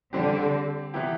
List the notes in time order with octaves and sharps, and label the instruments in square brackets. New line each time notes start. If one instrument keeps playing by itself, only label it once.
[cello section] D3 [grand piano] G3 C4 G4
[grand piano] C3 E3 B3 E4 G4